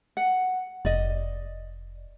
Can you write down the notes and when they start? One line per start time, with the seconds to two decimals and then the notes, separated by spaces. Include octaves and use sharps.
0.17 F#5
0.85 F1 D5 D#5